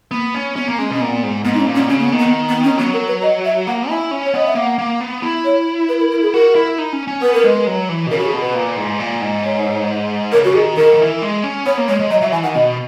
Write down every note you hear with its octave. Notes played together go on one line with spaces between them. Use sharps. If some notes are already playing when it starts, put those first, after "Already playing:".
A#3 B3
C#4
B3 C#4
A#3
G#3 C#4
B2 C#4
A#2 B3
G#2
G#2 B3
D#4
C#4
A#2
C#4
B2
C#3 C#4
A#3
B3
D#3
B3
B3
C#4
F#3 B3
A#4
B4
D#5
E5
A#3 F#5
E4 G#5
C#4
C#5
B3 D#5
E5
A#3 F#5
A#3
B3
E4
C#5
B4
A#4
A#4
G#4
F#4 A#4
E4
D#4
C#4
C#4
B3 B4
A#4
G#3 B4
F#3
E3
B2
C#3 A#4
F#4
G#4
B2
B4
A#2
G#2
A#2
G#2
C#5
C#3 A#4
F#4
D#3 G#4
D#3 A#4
F#3
E3
G#3
C#4
B3 C#5
A#3
G#3 C#5
G#3
F#3 D#5
F#3 E5
E3 G#5
D#3 F#5
B2 D#5